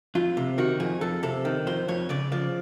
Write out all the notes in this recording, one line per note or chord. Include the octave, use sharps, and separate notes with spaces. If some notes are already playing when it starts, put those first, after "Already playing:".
F2 F4
C3
D#3 F#4
F2 G#4
F2 A4
C3 A4
D#3
F2 C5
F2 C#5
C#3 D5
F3 D5